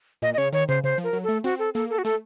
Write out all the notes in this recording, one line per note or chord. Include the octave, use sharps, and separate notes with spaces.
A#2 D#5
D#5
C#3 C#5
D#3 C#5
C#3 C5
C#3 C5
F3
A#4
F#3
A3 A4
C4 F#4
A4
A#3 A4
A4
F#4
A3 A4